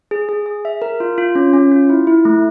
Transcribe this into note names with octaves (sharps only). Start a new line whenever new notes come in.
G#4
G#4
G#4
E5
A#4
F4
F4
C#4
C#4
F4
E4
E4
A3